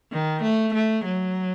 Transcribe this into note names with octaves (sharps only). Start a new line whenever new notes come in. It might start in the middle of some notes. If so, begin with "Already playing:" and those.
D#3
A3
A3
F#3